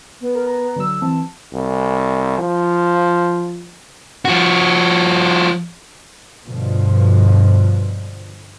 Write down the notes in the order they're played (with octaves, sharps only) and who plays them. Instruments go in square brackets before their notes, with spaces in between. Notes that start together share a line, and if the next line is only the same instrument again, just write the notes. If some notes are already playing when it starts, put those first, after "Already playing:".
[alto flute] B3
[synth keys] A#4
A#5
D3 F#3 E6
[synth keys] E3 C4 [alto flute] A5
[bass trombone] C2
F3
[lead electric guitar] F3 F#4
[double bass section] G2 B2 D3 F3